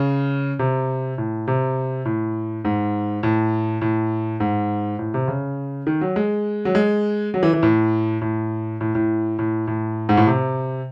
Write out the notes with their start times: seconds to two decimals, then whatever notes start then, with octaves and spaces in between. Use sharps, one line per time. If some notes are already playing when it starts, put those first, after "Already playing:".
Already playing: C#3
0.59 C3
1.18 A2
1.48 C3
2.05 A2
2.65 G#2
3.23 A2
3.81 A2
4.40 G#2
4.99 A2
5.14 C3
5.28 C#3
5.87 D#3
6.01 F#3
6.16 G#3
6.65 F#3
6.75 G#3
7.34 F#3
7.43 E3
7.53 E3
7.63 A2
8.21 A2
8.81 A2
8.95 A2
9.39 A2
9.68 A2
10.09 G#2
10.17 A2
10.27 C3